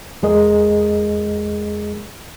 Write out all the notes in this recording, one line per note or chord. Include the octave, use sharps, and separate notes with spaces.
E2 G#3 G#4 A#4 D#5